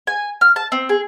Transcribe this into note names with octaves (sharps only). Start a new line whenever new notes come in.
G#5
F6
A5
C4
G#4